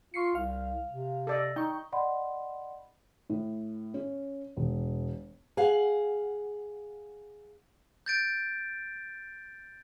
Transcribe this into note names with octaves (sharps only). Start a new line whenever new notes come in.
F4 C#6 C7 C#7
C2 F5
C3
A4 D5 D#5
D#4 G5 C#6
D5 D#5 F#5 B5 C6
A2
C#4
E1
G#4 F5 F#5
G6 A6 D7